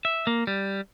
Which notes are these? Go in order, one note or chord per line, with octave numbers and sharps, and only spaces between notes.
E5
A#3
G3